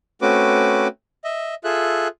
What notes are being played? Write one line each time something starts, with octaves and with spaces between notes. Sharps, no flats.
A3 C4 C#4 F#4 B4 D6
D#5 E5
F4 G#4 A4 E5 F#6